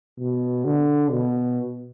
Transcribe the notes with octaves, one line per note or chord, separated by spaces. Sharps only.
B2
D3
B2